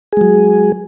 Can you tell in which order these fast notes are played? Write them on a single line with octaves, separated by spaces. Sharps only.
G#4 G#3 F#3